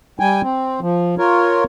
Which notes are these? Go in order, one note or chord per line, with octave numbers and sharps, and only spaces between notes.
G3 G5 G#5
C4
F3
F4 A#4 C#5